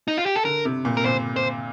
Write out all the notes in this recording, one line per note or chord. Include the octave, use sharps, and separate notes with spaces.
D#4
F4
G4
A4
D3 A#4
C3
A#2
A#4
A#2 C5
C5